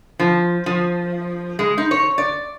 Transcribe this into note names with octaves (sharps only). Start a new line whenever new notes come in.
F3
F3
G#3
D#4
C#5
D5